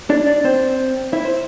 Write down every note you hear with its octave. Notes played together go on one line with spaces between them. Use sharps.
D4 D5
D4 D5
C4 C5
E4 E5
C5